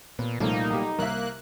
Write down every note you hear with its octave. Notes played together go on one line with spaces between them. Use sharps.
A#2 B3
C2 A#2 F3 G3 A3 A#3 D#4
B1 G4
C2 A#3 E5 F#6